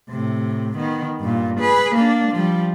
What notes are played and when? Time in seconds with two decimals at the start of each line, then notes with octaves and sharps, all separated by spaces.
0.10 A2 C3
0.77 D#3 B3
1.20 G2 A#2
1.60 G#4 B4
1.95 A#3 D4
2.32 F3 G3